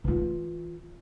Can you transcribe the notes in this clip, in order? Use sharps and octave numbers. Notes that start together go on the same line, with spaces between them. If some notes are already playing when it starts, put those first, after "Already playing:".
E3 F4